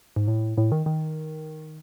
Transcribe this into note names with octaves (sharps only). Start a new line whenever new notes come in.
G#2
A2
A2
D#3
D#3